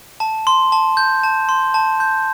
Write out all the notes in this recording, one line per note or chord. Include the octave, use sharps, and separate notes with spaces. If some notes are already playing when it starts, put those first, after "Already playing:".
A5
C6
A5
G6
A5
C6
A5
G6